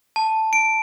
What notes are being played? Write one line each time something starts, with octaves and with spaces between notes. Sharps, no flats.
A5
D7